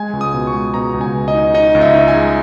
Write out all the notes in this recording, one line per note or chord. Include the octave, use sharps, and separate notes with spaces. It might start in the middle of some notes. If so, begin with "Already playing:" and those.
Already playing: G#3 G#5
C#2
D#6
B2
C#6
G#3
B2 A#5
C#2
G#5
C#2
D#5
D#4
D#4 D#5
C#2
E5
D#4
G#5
G#3